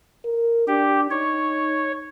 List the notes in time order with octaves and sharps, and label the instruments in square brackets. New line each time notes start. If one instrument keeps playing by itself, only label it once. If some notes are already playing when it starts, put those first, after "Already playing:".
[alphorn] A#4
[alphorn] D4 [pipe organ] G4
[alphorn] D#4 [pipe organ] C#5